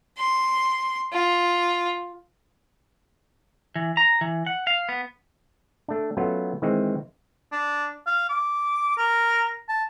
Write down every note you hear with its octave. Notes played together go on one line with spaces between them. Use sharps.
C6
F4
E3
A#5
E3
F#5
F5
B3
A3 D4
F#3 A3 B3 C#4 F4
D#3 E3 G#3 C4
D4
F5
D6
A#4
A5